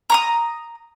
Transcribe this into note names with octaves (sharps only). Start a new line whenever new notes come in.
A#5 C#6 D#6